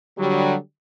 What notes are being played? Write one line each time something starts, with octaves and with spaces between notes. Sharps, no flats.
D3 F#3 G3